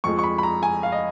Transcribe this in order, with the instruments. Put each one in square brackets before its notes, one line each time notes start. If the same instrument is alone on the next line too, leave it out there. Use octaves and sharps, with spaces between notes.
[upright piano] F2 F3 G#3 C#6
C#6
B5
B5
A#5
G#5
F5
D#5